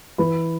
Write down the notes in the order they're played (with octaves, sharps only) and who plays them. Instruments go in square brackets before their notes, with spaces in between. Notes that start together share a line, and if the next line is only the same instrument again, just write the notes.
[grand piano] E3 B4 B5